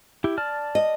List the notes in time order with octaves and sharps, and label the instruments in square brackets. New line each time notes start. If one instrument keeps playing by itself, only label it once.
[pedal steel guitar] E4 G4
D5 A5 F6
[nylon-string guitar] D#5